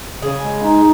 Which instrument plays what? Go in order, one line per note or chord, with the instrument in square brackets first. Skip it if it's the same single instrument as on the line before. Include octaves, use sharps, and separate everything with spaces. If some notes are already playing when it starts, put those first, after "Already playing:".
[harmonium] C#3 [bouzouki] G#4
[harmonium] G#3
D#4